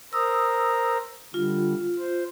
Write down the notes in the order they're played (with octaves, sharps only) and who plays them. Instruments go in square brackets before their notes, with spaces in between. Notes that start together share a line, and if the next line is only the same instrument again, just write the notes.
[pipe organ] A#4 C5 A#5 [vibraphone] D#6 E6
[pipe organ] D3 G3 [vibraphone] F4
[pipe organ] C5